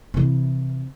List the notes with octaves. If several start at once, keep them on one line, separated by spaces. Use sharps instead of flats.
C3 E3